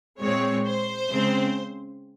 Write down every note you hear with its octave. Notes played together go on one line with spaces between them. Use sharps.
A#2 G#3 C4 C#5
C5
C#3 G#3 C4